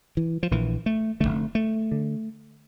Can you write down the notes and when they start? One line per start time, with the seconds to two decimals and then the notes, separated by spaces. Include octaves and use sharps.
0.17 E3
0.43 F3
0.51 A#1 A#2 E3
0.86 A3
1.20 F1 E2 D3 A3
1.55 A3
1.91 D3